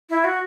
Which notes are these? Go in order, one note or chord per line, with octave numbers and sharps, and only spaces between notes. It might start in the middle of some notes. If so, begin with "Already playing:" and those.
E4
F#4